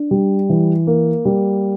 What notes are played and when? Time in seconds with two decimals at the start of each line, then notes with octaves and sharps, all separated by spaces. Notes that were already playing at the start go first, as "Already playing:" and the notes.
Already playing: D4
0.11 G3
0.49 E3
0.87 A#3
1.25 G3